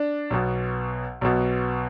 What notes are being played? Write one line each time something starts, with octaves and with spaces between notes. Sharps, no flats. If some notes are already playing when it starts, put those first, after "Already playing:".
Already playing: D4
B1 B2
B1 B2